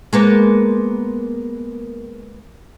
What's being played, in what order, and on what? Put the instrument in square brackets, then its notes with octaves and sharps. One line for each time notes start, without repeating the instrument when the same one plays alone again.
[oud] G#3 A#3 B3